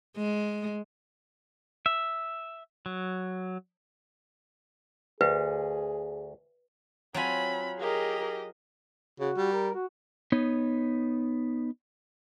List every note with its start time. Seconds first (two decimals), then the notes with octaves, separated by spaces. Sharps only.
0.17 G#3
1.86 E5
2.86 F#3
5.21 D2 G#4 B4
7.14 F#3 C4 F4 G#5 B5
7.80 G4 G#4 A#4 D#5
9.20 C#3 F#4
9.37 G3
9.53 A#4
9.74 F#4
10.32 B3 D#4 C#5